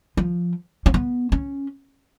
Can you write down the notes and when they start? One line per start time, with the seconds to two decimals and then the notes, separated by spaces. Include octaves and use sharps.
0.17 F3
0.86 C#4
0.94 B3
1.32 C#4